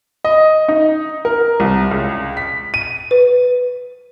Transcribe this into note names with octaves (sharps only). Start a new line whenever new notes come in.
D#5
D#4
A#4
C2
C#2
B6
D#7
B4